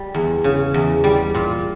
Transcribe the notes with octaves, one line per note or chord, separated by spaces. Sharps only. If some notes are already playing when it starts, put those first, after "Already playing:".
Already playing: G3
E2
C#3
E2
G3
A#2